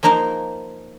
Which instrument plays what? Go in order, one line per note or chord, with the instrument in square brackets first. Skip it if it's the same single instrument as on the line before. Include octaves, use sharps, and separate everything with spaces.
[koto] F3 A#3 D#4 A#4 C5